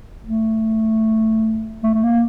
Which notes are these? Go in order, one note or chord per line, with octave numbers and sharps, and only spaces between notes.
A3
A3
A3
A#3